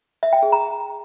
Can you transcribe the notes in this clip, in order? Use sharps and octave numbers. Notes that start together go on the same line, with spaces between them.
E5
G5
G#4
A#5